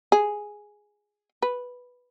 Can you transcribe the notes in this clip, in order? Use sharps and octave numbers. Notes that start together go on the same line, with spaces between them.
G#4
B4